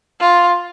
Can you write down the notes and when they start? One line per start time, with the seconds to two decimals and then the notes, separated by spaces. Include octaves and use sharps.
0.20 F4